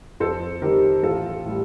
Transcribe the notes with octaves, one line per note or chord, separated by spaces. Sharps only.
F2 A4 C5
D#3 G3 G4 A#4
A1 F4 A4
A2 G3